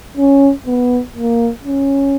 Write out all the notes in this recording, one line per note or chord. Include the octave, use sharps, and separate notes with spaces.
C#4
B3
A#3
C#4